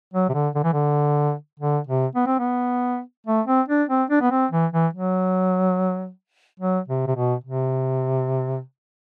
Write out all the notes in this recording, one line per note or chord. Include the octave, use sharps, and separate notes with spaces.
F#3
C3
D3
D3
E3
D3
D3
C3
B3
C4
B3
A3
C4
D4
C4
D4
B3
C4
E3
E3
F#3
F#3
C3
C3
B2
C3